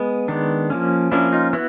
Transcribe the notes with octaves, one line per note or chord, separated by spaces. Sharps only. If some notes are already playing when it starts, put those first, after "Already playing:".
Already playing: G#3 B3
D#3 G#3 B3 D4
F3 A#3 C#4
F3 A#3 C#4 D4 E4
D#4 F4
B3 E4 F#4